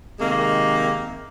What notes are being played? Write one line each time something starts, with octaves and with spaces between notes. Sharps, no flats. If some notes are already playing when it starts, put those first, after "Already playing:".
C3 D#3 G#3 A#3